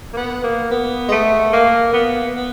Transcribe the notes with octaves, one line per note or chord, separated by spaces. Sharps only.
A#3
B3
A#3
B3
G#3
A3
A#3
B3
B3